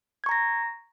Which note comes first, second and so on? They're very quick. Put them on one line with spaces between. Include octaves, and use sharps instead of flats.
G#6 C#6 A#5 A#6